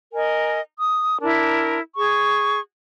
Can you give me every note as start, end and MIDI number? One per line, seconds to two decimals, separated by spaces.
0.14 0.60 70
0.14 0.60 75
0.14 0.60 80
0.79 1.18 87
1.21 1.79 62
1.21 1.79 64
1.21 1.79 70
1.96 2.60 68
1.96 2.60 85